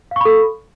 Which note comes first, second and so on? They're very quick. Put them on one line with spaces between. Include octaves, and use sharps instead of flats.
F5 C#6 B5 A4